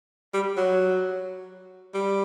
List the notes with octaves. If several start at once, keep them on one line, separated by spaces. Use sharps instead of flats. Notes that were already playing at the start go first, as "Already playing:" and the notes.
G3
F#3
G3